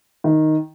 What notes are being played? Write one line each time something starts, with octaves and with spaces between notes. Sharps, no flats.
D#3